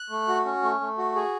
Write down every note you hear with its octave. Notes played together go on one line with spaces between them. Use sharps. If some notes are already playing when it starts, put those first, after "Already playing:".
Already playing: F#6
A3
F#4
C#4
A3
A3
F#4
G#4